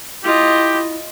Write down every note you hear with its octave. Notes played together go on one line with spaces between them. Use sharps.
E4 F4 G4 D#5